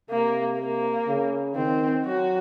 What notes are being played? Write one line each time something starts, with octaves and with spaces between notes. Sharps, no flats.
C3 A#3
A#3
C#3
D#3 C4
F#3 F#4